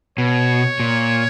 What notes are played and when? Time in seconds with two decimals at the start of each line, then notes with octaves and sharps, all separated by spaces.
0.18 B2 C#5
0.80 A#2